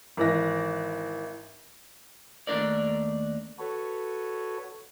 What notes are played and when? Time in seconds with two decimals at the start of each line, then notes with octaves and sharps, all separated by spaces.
0.17 G#1 E3 A#6
2.47 D#2 A3 D4 A#4 D5
3.59 F#4 A4 B4 C#5